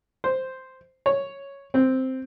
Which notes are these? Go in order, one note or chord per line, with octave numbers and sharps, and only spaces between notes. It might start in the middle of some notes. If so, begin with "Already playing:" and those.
C5
C#5
C4